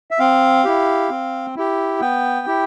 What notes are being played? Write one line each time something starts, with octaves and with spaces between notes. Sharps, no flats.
E5
C4 F5
E4 G4
C4
E4 G4
B3 G5
E4 G4